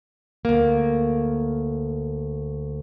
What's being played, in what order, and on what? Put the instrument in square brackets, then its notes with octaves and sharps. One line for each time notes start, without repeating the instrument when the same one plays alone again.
[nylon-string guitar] D2 A#3